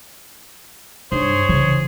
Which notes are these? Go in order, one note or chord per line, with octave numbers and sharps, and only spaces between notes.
G2 D#4 G#4 C5 C#5
C#3 E3